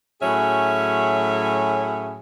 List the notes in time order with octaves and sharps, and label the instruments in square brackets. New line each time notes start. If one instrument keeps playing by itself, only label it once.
[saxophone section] A2 F#3 C#4 G#4 E5